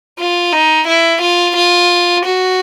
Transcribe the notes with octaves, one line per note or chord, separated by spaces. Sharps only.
F4
D#4
E4
F4
F4
F#4